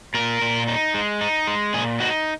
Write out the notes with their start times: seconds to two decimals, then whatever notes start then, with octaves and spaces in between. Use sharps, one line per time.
0.14 A#2 A#4
0.41 A#2
0.67 D#4
0.94 G#3
1.21 D#4
1.47 G#3
1.74 A#2 G#4
2.00 D#4 F#4